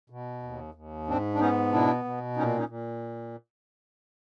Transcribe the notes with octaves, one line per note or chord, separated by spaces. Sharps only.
B2
D#2
D#2
G#2 C4 D4
D4
B3 C#4 D#4
B2 D4 E4
B2
A#2 C#4 D#4
C#4 D#4
A#2